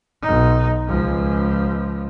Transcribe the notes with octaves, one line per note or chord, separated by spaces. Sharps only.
B1 D#4
C#2 F3